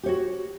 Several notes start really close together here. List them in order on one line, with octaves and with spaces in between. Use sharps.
G4 C#5 F#4